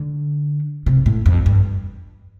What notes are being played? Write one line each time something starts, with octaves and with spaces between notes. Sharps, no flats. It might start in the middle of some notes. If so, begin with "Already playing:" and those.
Already playing: D3
C3
A2
F2
G2